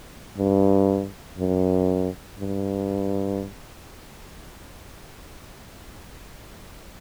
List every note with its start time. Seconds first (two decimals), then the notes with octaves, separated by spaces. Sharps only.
0.38 G2
1.38 F#2
2.39 G2